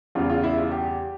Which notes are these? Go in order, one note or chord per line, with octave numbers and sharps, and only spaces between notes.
E2 C#3 G3 F4
F4
E4
F4
G4